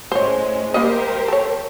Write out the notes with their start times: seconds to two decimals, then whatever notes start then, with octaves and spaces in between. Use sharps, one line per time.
0.12 A2 G#3 C#4 C5 C#5
0.74 G3 A#3 G4 A#4 C5 D#5
1.28 A4 C#5